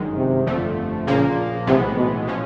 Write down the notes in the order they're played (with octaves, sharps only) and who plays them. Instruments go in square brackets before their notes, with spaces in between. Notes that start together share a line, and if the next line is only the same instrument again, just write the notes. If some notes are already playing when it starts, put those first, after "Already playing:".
Already playing: [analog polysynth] G1 F#2 D#3 G#3
[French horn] C3
[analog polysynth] G1 F2 D3 F3 A3
[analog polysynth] A#1 A#2 F3 A#3 [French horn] C#3
[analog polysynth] B1 A2 E3 G#3 B3 [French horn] C3
[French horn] B2
[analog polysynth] A#2 F3 G#3 C#4